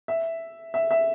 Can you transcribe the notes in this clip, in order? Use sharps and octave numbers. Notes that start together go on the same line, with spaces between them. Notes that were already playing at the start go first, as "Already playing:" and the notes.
E5
E5
E5